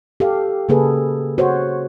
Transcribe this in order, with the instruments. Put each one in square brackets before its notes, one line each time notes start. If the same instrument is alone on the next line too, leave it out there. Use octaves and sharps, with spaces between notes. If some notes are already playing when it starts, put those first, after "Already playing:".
[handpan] G4 A4 F5
C#3 A#3 G#4 A4 B4
F#4 C5 C#5